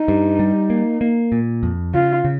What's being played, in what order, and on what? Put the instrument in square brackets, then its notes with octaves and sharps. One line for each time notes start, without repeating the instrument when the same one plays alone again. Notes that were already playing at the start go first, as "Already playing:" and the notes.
Already playing: [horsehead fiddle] D#4
[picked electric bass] G2
G3
A#3
A#3
A#2
F2
[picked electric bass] C#3 [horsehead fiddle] F4
[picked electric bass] C#3